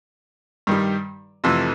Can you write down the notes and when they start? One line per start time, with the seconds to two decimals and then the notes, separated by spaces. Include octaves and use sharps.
0.67 G2 D#3 G3
1.44 F2 C3 E3 A3